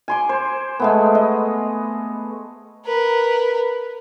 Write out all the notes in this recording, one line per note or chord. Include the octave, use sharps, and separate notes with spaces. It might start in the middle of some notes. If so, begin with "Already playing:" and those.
G#5 C6 D6
C5
G#3 A3 B3
D#5
A#4 B4